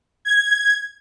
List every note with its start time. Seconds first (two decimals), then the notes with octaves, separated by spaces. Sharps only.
0.25 G#6